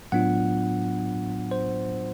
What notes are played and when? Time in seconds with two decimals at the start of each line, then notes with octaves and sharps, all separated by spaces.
0.12 A2 F#3 B3 D4 F4 F#5
1.51 C5